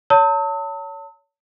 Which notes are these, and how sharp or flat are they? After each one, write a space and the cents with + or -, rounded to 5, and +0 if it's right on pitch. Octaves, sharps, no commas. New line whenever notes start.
C#5 +25 A5 +40 E6 -45